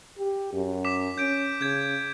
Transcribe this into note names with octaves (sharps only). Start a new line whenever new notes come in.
G4
F#2
D6 B6 E7
C#4 G6 D7
C#3 G6 G#6